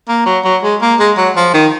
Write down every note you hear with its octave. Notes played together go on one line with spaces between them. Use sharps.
A#3
F#3
F#3
G#3
A#3
G#3
F#3
F3
D#3